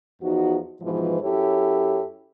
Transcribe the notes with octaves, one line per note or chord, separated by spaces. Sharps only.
E2 F3 D#4 F#4
G#2 B2 E3 F3
F#2 E4 G4 A4 C#5